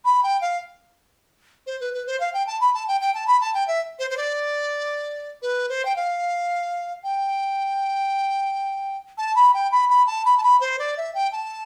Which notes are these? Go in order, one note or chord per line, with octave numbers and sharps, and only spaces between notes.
B5
G5
F5
C5
B4
B4
C5
F5
G5
A5
B5
A5
G5
G5
A5
B5
A5
G5
E5
C5
C5
D5
B4
C5
G5
F5
G5
A5
B5
G5
B5
B5
A5
B5
A5
B5
C5
D5
E5
G5
A5